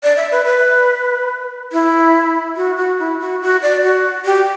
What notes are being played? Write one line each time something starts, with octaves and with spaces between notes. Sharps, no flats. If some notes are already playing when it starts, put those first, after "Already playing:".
D5
E5
B4
B4
E4
F#4
F#4
E4
F#4
F#4
D5
F#4
G4